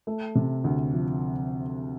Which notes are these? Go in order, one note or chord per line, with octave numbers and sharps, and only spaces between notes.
A3
C3
D2
F3